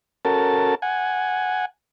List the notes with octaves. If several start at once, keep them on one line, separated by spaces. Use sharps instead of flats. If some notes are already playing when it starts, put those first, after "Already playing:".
C#4 F#4 A4 A#4 A5
F#5 G#5